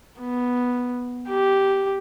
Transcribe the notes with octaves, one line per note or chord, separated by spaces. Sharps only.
B3
G4